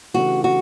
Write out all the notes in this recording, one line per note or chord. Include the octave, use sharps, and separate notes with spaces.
C#3 E3 A3 D4 F#4 G4
F#4